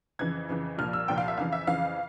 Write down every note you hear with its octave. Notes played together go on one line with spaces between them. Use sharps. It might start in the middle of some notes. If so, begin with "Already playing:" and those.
F2 C#3 E3 G#6
F2 C#3 E3
C2 A#2 F3 F6
E6
C2 A#2 F3 G5
F5
E5
F2 C#3 E3 F5
E5
F2 C#3 E3 F5